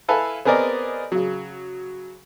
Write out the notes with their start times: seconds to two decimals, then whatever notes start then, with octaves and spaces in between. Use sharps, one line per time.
0.08 E4 A4 B4 F5 G#5
0.45 B3 C4 G#4 A#4 D5 D#5
1.12 C#3 F#3